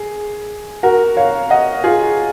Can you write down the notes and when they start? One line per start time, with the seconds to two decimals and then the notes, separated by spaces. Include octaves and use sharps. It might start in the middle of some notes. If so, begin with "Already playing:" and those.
Already playing: G#4
0.83 F#4 A#4
1.17 C#5 F5
1.50 D#5 F#5
1.84 F4 G#4